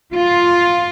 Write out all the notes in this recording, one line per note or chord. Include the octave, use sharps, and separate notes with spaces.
F4